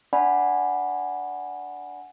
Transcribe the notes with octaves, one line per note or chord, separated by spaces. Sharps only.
D4 D5 F#5 G#5 B5